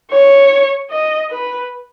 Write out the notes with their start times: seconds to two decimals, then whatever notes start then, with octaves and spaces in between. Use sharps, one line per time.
0.10 C#5
0.91 D#5
1.31 B4